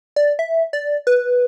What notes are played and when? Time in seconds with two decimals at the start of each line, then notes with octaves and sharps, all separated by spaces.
0.16 D5
0.39 E5
0.73 D5
1.07 B4